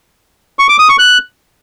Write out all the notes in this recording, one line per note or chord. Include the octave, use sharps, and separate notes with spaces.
C#6
D6
D#6
C#6
F#6